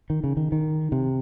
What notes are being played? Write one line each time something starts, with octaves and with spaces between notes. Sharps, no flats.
D#3
C#3
D#3
D#3
C3